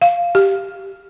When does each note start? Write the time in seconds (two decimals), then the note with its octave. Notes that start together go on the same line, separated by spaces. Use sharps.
0.02 F5
0.35 G4